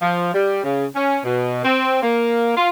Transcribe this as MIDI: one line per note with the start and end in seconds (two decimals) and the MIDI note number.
0.02 0.31 53
0.34 0.62 55
0.64 0.86 49
0.95 1.20 61
1.24 1.63 47
1.64 2.00 60
2.02 2.55 58
2.56 2.70 65